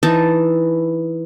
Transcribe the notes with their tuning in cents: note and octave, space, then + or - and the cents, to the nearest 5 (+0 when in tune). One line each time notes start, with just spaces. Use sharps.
E3 +0 D#4 +0 A5 +0